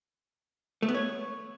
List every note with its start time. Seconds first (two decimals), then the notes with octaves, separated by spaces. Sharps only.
0.82 A3
0.88 B3
0.94 C#5